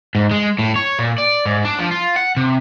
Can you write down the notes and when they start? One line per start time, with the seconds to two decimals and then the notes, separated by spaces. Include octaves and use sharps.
0.15 G#2
0.31 G#3
0.59 A2
0.76 C#5
0.99 A#2
1.18 D5
1.46 G#2
1.65 D4
1.79 F3
1.91 F4
2.16 F#5
2.37 C3